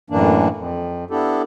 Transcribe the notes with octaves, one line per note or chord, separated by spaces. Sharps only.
F#2 A2 E3 A#3 D4
F2
B3 D4 E4 G4 A4